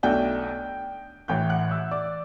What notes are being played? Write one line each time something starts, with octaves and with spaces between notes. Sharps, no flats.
B1 B2 A3 D4 G5 G6
A1 A2 E3 G5 G6
F#5 F#6
E5 E6
D5 D6